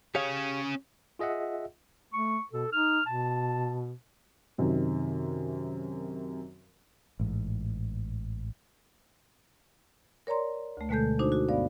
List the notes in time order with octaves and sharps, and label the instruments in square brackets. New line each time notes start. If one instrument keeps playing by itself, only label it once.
[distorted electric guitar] C#4 G#4 [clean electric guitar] G4 C#5 F5
[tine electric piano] F4 G#4 D#5 E5 F#5
[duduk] A3 [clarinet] C#6
[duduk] B2 [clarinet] A4
[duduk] D#4 [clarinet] F6
[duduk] B2 [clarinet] A5
[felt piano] F#2 C3 D#3
[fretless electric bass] A1 G#2
[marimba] A#4 C#5 D5 A#5 C6
D2 A3
B2 D3 G#3 A3 A4 G6
D4 D#4 F#4 C5
F#4
G2 B3 D5 F5